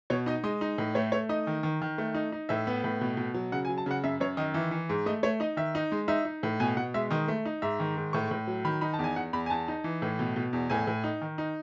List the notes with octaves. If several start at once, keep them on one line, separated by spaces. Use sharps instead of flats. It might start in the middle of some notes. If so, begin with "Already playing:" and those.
B2 C#5
D#4 D#5
G#3 D#5
D#4
A2
A3 C#5
A3 C#5
D#4 D#5
D#3
D#3
D#3
A3
D#4
D#4
A2 E5
B3
A2
B2
B2
F#3
C#3 F#5
G#5
F#3
A5
C#3 F#5
F#2 E5
F#2 C#5
D#3 D#5
E3 E5
E3
G#2
A3 D#5
A3 C#5
D#4 D#5
D#3 E5
D#4
G#3
D#4 E5
D#4
A2
B2 G#5
B2 F#5
G#3 E5
D#3 D#5
A3
D#4
G#2 E5
D#3
G#2
A2 C#6
A2
F#3
D#3 B5
D#4 B5
A5
E2
G#5
E2 F#5
E2 B5
G#5
E2 A5
D#4
E3
A2
B2
B2
E2
A2 G#5
A2
D#4
D#3
D#4